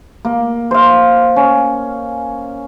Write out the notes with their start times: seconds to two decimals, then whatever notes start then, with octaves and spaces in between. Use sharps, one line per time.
0.25 A#3
0.71 C5 F5
1.36 C#4